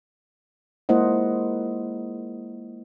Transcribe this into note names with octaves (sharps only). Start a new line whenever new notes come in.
G#3 A#3 E4 C5 D#5 F#5